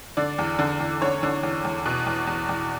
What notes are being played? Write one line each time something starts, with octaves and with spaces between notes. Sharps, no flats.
D3 D5
E2
D3
E2
D3 C#5
D3
E2
E2
B2
E2
E2
E2